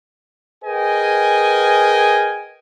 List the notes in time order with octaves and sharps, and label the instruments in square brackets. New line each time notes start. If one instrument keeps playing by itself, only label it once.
[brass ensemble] G#4 A#4 B4 D#5 G5 G#5